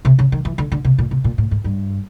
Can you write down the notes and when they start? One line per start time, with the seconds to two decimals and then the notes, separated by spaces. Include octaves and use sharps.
0.05 C3
0.19 C#3
0.32 D#3
0.45 E3
0.58 D3
0.72 D3
0.85 C3
0.99 A#2
1.11 C3
1.24 A#2
1.38 A2
1.51 G#2
1.64 G2